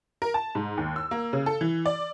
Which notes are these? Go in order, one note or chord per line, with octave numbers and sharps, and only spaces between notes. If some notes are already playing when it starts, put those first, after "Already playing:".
A#4
A5
G#2
D#2
E6
A#3
C#3
A4
E3
D5